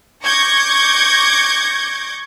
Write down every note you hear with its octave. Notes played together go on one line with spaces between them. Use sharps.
C#6 D6 G6 G#6 A#6 C#7